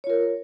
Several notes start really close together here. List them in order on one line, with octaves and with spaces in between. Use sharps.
C#5 F4 A#4